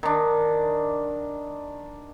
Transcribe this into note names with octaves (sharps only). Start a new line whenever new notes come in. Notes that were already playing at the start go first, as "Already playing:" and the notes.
D#3 D4